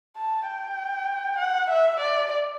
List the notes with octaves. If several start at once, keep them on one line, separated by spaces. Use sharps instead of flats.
A5
G5
F#5
E5
D5